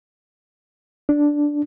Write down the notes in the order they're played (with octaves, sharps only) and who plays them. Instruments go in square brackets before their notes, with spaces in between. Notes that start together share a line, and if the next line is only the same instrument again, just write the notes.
[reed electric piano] D4